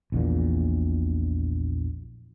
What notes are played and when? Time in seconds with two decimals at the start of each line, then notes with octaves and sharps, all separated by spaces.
0.12 A#1 E2 A#2